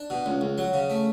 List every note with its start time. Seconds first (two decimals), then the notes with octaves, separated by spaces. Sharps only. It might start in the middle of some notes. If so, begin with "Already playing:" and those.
Already playing: D4
0.10 B2
0.26 C#2
0.41 C#2
0.58 F#3
0.73 C#3
0.90 A3